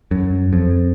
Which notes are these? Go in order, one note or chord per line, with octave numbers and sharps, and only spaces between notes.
F#2
F2